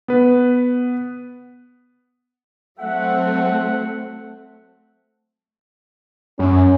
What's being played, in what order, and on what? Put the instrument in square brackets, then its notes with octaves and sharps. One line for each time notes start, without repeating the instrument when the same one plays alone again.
[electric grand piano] B3 B4
[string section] F#3 A3 C4 [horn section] E5 F#5
[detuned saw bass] F#2 [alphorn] C#4